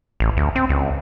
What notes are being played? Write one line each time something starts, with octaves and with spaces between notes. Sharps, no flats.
A1
D2
C4
C#2